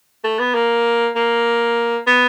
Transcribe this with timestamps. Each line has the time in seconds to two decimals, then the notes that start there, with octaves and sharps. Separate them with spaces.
0.24 A3
0.39 B3
0.55 A#3
1.16 A#3
2.07 B3